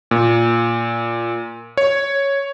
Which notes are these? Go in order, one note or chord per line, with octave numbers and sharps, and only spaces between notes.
A#2
C#5